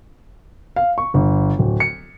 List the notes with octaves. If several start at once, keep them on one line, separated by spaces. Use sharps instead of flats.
F5
C#6
G1
D1
C#7